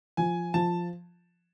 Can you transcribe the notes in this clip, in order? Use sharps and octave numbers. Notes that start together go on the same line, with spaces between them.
F3 G#5
F3 A5